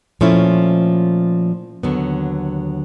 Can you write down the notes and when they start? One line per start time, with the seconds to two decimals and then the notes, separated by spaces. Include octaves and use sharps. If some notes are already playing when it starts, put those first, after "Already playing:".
0.21 A#2 F3 A3 C#4 E4
1.83 D#2 D3 F#3 B3